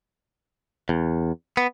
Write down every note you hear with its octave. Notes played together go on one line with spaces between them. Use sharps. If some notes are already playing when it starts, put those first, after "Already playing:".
E2
B3